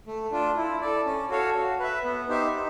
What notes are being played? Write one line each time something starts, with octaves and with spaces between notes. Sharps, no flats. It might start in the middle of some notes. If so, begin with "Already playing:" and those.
A3
D4 F4
E4
A4 D5
C#4
F#4 A4 C#5 F5
F#4
B4 E5
B3
D#4 G4 C5 E5
D#4